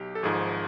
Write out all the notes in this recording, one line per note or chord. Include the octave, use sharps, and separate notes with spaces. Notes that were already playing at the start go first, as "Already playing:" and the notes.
Already playing: B1 G4
A4
G#1 G#2 F3 G#4